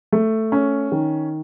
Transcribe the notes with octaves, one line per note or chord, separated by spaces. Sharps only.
A3
C#4
D#3